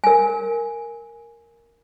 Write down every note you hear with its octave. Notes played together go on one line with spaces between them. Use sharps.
A#4 G#5